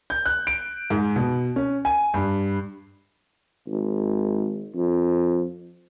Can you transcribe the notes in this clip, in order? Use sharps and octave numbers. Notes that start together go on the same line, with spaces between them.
G6
F#6
D7
G#2
B2
C#4
G#5
G2
G#1
F2